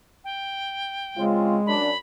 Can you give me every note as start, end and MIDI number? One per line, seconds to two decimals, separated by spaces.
0.24 1.24 79
1.17 1.57 49
1.17 1.77 56
1.17 1.57 60
1.17 1.57 65
1.66 1.89 42
1.66 1.89 62
1.66 1.98 83